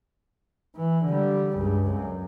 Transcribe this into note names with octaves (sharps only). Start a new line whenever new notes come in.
E3
D3 G3
C#2 G2
F#2